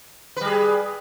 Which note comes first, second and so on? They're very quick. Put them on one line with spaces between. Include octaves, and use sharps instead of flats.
B4 G3 G#4